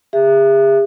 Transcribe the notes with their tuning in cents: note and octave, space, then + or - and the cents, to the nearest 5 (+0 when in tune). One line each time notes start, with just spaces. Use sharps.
G#4 -45 E5 +20